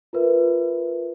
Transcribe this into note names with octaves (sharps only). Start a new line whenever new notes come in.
F4 A#4 B4 E5